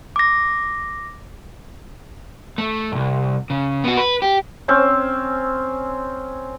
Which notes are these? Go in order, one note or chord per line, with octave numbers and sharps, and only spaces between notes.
D6 A#6
A3
C2 G2
C#3
B3 F#4
B4
G4
C4 C#4 C5 E6